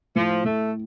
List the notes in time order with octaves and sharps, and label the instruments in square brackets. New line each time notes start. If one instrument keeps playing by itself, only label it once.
[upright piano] A2 [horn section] F3
[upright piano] A2 [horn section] A3